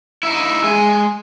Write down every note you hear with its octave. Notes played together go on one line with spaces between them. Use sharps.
D#4 E4
G#3 G#5